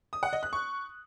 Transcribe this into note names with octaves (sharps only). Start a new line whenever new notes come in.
D#6
F#5
D#5
F#6
C#6